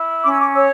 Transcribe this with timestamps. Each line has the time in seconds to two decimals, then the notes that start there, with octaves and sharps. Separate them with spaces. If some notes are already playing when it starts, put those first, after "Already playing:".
Already playing: E4
0.24 C#4 D6
0.31 E6
0.39 D6
0.54 C#5 E6